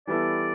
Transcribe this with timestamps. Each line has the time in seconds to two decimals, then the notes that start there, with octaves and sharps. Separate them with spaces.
0.07 E3 G3 B3 E4 A4 D5